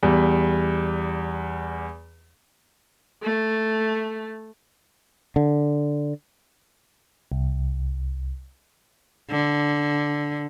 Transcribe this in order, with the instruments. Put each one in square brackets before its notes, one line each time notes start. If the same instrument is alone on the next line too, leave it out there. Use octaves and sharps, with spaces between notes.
[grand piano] E2 G3
[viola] A3
[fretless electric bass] D3
[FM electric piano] C2
[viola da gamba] D3